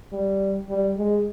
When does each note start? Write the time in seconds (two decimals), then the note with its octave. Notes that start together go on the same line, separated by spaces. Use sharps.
0.13 G3
0.70 G3
0.97 G#3